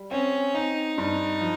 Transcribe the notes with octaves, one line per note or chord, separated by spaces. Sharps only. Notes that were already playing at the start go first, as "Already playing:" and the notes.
Already playing: G3
C4 C#4
C4 D#4
G2
F3